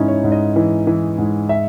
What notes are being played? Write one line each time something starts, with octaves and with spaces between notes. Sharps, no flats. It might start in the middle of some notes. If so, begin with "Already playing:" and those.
Already playing: G#2 E3 C#4 D#4 E4
C#5
G#2
D#5
E3
E3
G#2
E5